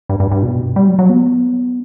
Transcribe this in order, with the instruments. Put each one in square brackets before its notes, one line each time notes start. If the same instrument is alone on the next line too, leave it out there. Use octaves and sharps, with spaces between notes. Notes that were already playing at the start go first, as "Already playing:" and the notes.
[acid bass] G2
G2
G2
B2
G3
F#3
F#3
B3